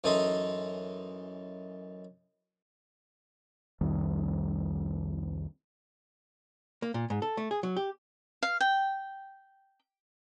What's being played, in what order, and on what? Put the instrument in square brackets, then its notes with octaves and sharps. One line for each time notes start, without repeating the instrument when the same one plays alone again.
[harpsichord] F#2 E3 D#4 A4 D#5 C6
[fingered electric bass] C2 F2 D#3 G3
[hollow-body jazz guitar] A#3
A#2
G#2
A4
A3
G#4
F#3
G4
[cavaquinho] F5
G5